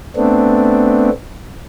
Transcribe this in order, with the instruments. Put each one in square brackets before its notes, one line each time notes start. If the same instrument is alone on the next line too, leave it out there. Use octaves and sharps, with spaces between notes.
[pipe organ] A3 B3 C4 D4